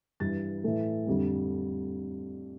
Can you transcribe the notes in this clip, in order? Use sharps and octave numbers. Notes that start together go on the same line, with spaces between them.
G2 E3 G3 A6
A2 E3 A3
F2 D3 G3